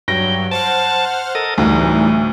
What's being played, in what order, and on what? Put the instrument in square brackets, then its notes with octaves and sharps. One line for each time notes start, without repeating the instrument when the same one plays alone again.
[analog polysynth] G2 F#3 [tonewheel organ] G5 [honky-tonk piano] A#6
[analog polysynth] C5 F#5 F6 [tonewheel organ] A5
[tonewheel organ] A4 A#4 D#5
[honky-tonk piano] D2 [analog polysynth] A2 E3 G3 [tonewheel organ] D#4